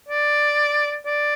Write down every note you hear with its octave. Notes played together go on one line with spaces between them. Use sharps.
D5
D5